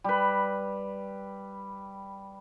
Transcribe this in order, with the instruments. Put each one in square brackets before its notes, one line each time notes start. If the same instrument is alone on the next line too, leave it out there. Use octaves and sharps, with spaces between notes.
[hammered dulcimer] G3 B4